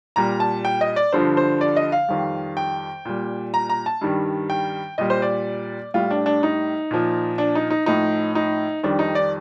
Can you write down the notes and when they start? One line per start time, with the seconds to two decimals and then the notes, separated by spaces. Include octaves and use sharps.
0.16 A#2 G3 A#5
0.40 A5
0.65 G5
0.81 D#5
0.96 D5
1.12 G2 D3 F3 C5
1.37 C5
1.61 D5
1.76 D#5
1.92 F5
2.08 F2 D#3 G3
2.57 G5
3.05 A#2 G3
3.54 A#5
3.69 A#5
3.86 A5
4.01 G2 D#3 G3
4.50 G5
4.98 A#2 G3 D#5
5.10 C5
5.22 D5
5.94 A2 G3 F4
6.11 D4
6.26 D4
6.43 D#4
6.91 A#2 F3
7.38 D4
7.55 D#4
7.71 D#4
7.86 A2 F3 D#4
8.35 D#4
8.83 F2 D#3 G3 D4
8.99 D#4
9.15 D5